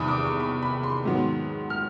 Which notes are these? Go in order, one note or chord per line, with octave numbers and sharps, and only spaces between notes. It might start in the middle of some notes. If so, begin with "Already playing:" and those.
Already playing: E2 C3 D#3 G3 B5 D#6
D6
C#6
B5
B5
C6
G#2 D#3 F#3 B3
F6